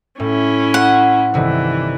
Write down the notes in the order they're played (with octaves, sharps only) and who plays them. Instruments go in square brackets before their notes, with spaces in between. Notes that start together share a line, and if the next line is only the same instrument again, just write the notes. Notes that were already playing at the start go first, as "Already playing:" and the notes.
[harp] A2 [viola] C#4 E4
[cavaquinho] F#5 [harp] C6 C7
[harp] G1 C3 D#3 [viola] E3